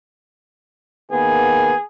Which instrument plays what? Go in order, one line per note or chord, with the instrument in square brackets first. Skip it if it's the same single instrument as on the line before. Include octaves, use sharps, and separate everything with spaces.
[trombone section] D#3 A#3 B3 [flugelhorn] G#4